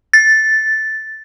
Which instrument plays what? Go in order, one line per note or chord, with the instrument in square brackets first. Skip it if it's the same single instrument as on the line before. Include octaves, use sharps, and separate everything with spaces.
[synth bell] A6